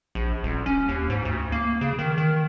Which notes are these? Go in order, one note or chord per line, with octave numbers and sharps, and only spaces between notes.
A#1
D#1
C#4
D#2
G#2
D2
A#3
C#3
D#3
D#3